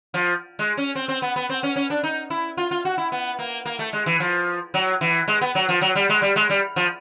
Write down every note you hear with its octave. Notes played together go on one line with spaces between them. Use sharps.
F3
G#3
C#4
C4
C4
B3
B3
C4
C#4
C#4
D4
D#4
E4
F4
F4
F#4
E4
B3
A#3
A#3
A3
G#3
E3
F3
F#3
E3
G#3
B3
F#3
F3
F#3
G3
G#3
G3
G#3
G3
F3